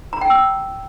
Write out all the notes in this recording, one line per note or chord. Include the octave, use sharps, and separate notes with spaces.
A#5
G5
E6